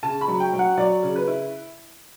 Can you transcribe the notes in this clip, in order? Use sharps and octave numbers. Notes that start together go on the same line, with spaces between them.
C#3 A5
B5
F#3
G5
F#3
F#5
F#3 D5
C#3
B4
E4